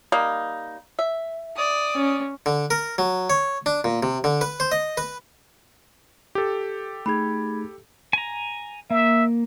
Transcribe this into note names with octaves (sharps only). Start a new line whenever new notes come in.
G3 A#3 D#4
E5
D5 D#6
C#4
D3
A#4
F#3
C#5
D4
A#2
C3
D3
B4
C5
D#5
B4
G4 A4
A3 D#4 G#4 B5 G#6
G#5 A#5
A#3 E5